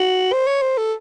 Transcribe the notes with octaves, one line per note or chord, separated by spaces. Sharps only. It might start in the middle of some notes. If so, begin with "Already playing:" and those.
Already playing: F#4
C5
C#5
C5
A4